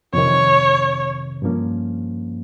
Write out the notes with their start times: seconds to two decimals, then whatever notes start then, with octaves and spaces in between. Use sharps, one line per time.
0.14 F2 C3 D#3 C#5
1.42 G2 F3 A#3 C#4